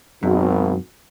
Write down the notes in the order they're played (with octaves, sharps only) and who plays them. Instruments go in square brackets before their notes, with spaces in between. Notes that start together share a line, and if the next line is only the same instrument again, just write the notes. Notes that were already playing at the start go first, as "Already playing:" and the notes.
[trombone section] G#1 B2 [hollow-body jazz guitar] F#2